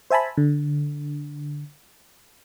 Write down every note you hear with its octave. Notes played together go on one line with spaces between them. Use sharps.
C5 E5 G#5 A5 B5
D3